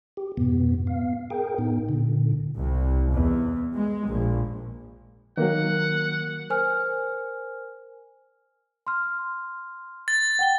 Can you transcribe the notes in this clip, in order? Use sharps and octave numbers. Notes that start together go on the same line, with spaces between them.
G4
F2 G#2 B2 B3
B3 F5
G#4 A#4 G5
A2 B3 D#4
A#2 D3
C2
E2
G#3
A#1
D#3 F#3 A#3 F#5
A#4 C5 G#5 F6
C6 F6
A6
F#5 G5 G7